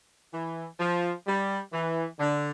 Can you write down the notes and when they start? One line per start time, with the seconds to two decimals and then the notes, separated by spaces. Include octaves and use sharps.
0.33 E3
0.79 F3
1.27 G3
1.72 E3
2.19 D3